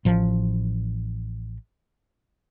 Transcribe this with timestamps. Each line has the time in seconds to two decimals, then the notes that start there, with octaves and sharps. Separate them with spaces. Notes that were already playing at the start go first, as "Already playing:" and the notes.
0.05 A1 F3